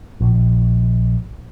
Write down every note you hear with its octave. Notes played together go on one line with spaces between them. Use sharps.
A#1